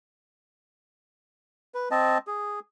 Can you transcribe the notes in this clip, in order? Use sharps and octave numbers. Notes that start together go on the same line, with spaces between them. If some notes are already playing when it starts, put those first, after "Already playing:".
B4
C4 D#5 A5
G#4